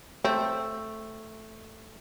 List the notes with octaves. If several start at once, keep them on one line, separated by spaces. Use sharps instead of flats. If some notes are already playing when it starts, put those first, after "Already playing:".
A3 C4